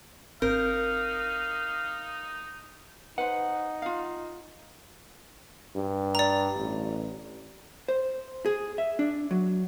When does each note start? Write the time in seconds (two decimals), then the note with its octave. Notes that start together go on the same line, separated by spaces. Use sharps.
0.42 G#1 C4 D#4 A#4 F5 G6
3.18 D#4 B4 C5 F#5
3.82 F4 F5
5.75 G2
6.15 D5 A#5
6.57 A1
7.88 C5
8.46 G#4
8.78 E5
8.99 D4
9.31 F#3